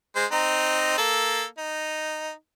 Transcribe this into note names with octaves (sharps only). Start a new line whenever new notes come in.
G#3 C5
C4 D#4 A#5
A#3 A4
D#4